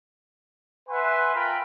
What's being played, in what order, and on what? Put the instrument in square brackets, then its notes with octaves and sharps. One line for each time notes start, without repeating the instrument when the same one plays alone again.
[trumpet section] B4 E5 F#5 G#5 C6
F4 A#4 G5 B5